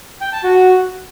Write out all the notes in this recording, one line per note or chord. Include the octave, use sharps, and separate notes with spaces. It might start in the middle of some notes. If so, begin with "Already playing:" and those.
G5
A5
F#4